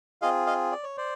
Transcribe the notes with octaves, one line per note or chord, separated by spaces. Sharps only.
C4 F4 G#4 D#5 F5
D#5 F5
D5
C#5
C5 D5